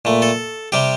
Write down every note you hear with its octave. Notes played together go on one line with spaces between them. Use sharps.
A#2 A3
A4
C3 G3 G4